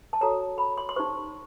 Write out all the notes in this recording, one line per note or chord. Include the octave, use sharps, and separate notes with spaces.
A5
F#4 A4 C#5 A#5
B5
C6
C6
D#4 G4 C5 C#6